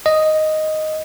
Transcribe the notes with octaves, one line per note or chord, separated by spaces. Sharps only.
D#5